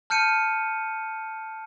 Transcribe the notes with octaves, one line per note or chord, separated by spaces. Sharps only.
A5 F6 G6 C#7 D#7